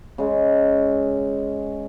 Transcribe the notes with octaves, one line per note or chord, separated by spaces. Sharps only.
C#3 G#3